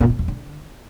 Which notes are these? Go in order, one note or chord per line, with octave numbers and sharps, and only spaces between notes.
A#2
A2
E2
D3